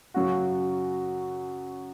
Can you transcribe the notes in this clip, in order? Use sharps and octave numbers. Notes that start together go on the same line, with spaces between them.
F#2 C#3 F#3 C#4 F#4